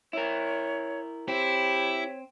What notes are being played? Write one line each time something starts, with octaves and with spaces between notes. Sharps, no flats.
E4 A#4 C#5
C4 E4 G4 C#5